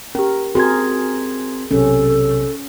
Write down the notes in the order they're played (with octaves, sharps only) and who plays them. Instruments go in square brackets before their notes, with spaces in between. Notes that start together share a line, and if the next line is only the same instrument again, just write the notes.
[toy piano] C#4 G4 [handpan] A#4
[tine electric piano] C4 C6 G#6 [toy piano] F#4 [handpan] G#4 A#4
[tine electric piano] B1 C3 [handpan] C#4 [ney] A4